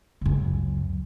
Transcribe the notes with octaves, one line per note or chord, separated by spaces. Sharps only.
C#2 F#2